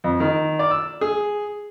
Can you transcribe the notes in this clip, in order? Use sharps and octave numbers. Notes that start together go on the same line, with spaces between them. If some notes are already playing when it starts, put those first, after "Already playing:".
F2
D#3
D5
E6
G#4